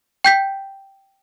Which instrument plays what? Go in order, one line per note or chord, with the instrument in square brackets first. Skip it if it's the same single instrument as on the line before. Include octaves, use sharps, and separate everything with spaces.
[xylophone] G5 G6 B6